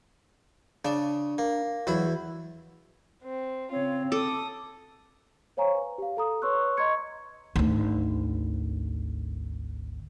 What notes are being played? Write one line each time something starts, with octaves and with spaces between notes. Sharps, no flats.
C#3 D4
A#3
E2 F#3 E4
C4
C#3 C4 F4 C#5
A4 D6 D#6
C5 C#5 F5 G#5 A#5 C#6
B4
G4 F5
A4 A#5 D#6
B4 C#5 C6 C#6 E6 F#6
D#5 A#5 C6 C#6 G#6 C#7
G#1 D2